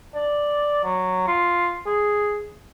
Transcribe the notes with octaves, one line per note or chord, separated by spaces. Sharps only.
D5
F#3
F4
G#4